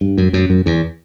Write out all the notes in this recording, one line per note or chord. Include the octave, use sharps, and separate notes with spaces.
G2
F#2
F#2
F#2
E2